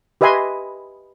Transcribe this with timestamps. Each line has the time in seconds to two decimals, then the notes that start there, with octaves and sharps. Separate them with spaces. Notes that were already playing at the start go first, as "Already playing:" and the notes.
0.21 G4 B4 D#5 E5 G#5 C6